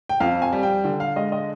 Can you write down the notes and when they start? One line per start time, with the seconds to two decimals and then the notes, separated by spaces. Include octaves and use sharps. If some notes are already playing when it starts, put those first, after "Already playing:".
0.09 G5
0.20 F2 F5
0.42 G#5
0.53 G3
0.63 G5
0.84 D3 G5
1.00 F5
1.16 G#3 D#5
1.32 D#5